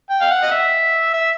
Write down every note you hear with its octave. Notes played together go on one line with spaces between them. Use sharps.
G5
F5
F#5
D#5
E5
E5